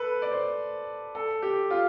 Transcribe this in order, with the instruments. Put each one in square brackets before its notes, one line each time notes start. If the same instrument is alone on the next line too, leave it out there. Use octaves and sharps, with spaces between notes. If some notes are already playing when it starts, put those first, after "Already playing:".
Already playing: [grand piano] A4 B4
D5
C5
A4
G4
F4